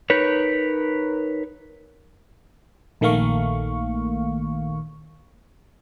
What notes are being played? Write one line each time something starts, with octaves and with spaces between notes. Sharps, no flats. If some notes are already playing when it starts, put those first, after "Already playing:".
D#4 A#4 B4 C#5
A#1 D#3 A3 A#3 F5 C#6